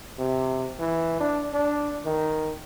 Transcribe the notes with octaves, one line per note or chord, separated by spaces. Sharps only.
C3
E3
D4
D4
D#3